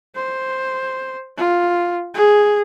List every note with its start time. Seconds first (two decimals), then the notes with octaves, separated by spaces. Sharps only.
0.15 C5
1.37 F4
2.14 G#4